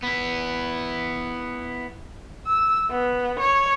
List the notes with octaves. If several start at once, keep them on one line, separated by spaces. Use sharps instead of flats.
B3 E4
E6
B3
C#5